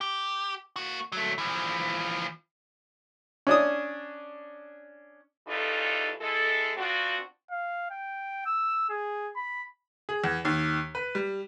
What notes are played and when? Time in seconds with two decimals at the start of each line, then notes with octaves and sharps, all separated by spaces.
0.01 G4
0.76 A#3 F#4
1.12 F#3 A3
1.38 E3 F3
3.47 C#4 D4 D#6
5.49 C#3 E3 G3 D#4 F4 A4
6.21 G#3 E4 A4
6.78 B3 C4 D4 F4 F#4
7.51 F5
7.91 G5
8.46 E6
8.90 G#4
9.36 B5
10.09 G#4
10.24 E2
10.45 D#2
10.95 B4
11.15 G3